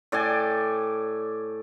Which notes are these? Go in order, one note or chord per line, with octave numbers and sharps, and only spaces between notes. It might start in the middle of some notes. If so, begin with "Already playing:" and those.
A2 D5 G5 G#5